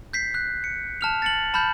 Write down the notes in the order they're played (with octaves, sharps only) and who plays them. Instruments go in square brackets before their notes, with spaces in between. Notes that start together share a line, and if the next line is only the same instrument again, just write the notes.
[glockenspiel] G6 B6 C7
F#6
C#7
A5 F6 F7
A6 C#7 F#7
A5 B5 F6 G6